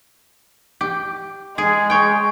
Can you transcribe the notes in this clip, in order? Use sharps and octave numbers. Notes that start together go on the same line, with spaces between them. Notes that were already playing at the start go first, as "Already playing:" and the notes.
G4
G#3 G#4
C#5 G5